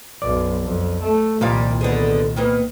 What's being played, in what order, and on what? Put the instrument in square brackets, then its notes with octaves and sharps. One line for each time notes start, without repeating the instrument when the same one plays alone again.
[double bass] B1 F#2 [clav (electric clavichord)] D5
[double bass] F2
A3
[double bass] C2 D#3 [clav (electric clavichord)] A#2 [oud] F3 G3 F5
[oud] D3 B3 G#4
D#3 A#3 B3